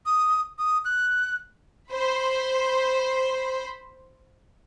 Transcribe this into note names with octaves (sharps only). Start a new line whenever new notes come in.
D#6
D#6
F#6
C5 B5